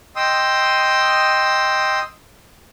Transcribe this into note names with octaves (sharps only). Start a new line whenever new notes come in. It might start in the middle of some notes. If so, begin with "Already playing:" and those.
D#5 G5 C6 D#6 E6